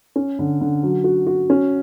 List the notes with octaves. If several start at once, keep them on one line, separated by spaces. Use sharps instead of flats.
C#4
D3
D3
F#3
F#4
F#4
C#4